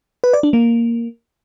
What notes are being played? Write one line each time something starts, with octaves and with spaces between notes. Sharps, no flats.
B4
D5
D4
A#3